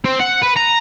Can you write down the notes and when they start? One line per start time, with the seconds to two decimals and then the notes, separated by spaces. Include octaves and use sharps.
0.05 C4
0.20 F#5
0.43 B4
0.57 A#5